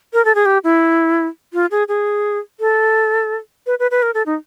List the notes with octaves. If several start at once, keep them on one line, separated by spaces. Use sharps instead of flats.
A#4
A4
G#4
G4
E4
F4
G#4
G#4
A4
B4
B4
B4
A#4
A4
D#4